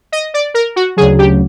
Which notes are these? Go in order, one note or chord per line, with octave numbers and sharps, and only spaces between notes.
D#5
D5
A#4
F#4
D2 C#3 F#3 G#4
G4